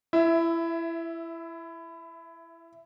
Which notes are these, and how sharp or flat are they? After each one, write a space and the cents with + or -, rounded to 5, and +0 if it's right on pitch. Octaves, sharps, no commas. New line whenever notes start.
E4 +20 E5 -5